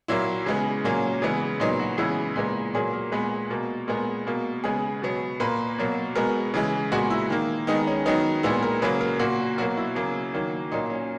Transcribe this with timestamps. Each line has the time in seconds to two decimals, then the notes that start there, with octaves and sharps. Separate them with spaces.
0.08 A#2 F#3 A#3 E4
0.46 C#3 G#3 B3
0.84 A#2 F#3 A#3 C#4
1.22 C#3 E3 G#3 B3
1.60 A#2 F#3 B3 D#4
1.80 F#4
1.98 C#3 E3 G#3 B3 E4
2.36 A#2 G#3 B3
2.74 A#2 F#3 A#3 G#4
2.93 A#4
3.12 A#2 G#3 B3 B4
3.50 B2 A#3
3.88 A#2 G#3 B3 A#4
4.27 B2 A#3
4.64 C#3 G#3 B3 G#4
5.02 B2 F#3 B3
5.40 A#2 A#3 B4
5.78 B2 F#3 A#3
6.15 B2 G#3 B3 A#4
6.54 C#3 E3 G#3
6.92 A#2 G#3 B3 F#4
7.10 E4
7.30 D#3 A#3
7.67 D#3 G#3 B3 D#4
7.87 C#4
8.06 D#3 F#3 B3 D#4
8.43 A#2 G#3 B3 E4
8.62 A#4
8.82 C#3 F#3 A#3 B4
9.01 A#4
9.19 A#2 A#3 F#4
9.58 B2 F#3 A#3 F#4
9.77 E4
9.95 C#3 F#3 A#3
10.34 D#3 F#3 A#3
10.72 A#2 F#3 A#3 D#4
10.90 C#4